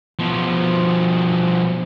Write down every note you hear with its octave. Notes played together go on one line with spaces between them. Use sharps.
B2 F3